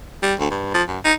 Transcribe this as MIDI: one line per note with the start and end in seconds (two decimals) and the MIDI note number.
0.23 0.34 55
0.39 0.51 38
0.51 0.74 43
0.74 0.83 53
0.88 0.99 42
1.05 1.13 63